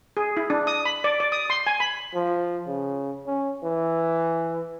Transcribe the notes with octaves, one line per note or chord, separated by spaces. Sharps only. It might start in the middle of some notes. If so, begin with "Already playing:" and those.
G#4
E4
D4
D#6
B5
D5
D5
D#6
C6
G#5
B5
F3
C#3
C#4
E3